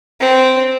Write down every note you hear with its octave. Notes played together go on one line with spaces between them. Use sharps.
C4